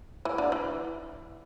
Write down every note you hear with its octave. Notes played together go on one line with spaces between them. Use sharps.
E3
D3
E3